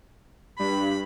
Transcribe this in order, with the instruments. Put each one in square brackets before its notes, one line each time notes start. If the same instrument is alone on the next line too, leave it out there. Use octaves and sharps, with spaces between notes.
[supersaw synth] G2 [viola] B5